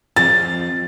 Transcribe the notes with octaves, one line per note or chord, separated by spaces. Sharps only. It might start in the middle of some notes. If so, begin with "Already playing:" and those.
F2 F3 A6